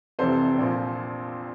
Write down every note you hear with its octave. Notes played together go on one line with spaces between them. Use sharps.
F1 F2 C3 E3 A4 C5
A#1 A#2 F3